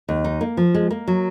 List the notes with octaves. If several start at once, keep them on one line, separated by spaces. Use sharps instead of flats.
D#2
D#4
A#3
F3
G#3
A#3
F#3